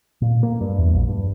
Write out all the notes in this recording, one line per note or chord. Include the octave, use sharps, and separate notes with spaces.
A#2
A#3
G2
E2
A#1
G2